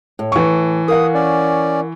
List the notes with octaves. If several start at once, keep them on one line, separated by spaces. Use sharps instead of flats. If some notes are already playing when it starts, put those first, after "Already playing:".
A2
E3 C#6
A#4 F5 F#5 D#6
C#4 D5